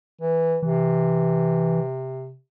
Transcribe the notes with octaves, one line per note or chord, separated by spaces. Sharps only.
E3
C3 E3